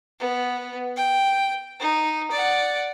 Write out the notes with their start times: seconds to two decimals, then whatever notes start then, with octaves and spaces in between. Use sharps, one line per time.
0.20 B3
0.96 G5
1.80 D#4
2.31 D5 F#5